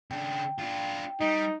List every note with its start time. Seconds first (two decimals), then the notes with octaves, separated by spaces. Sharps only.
0.11 C#3 D4 G5
0.59 D4 F4
1.21 G3 D#4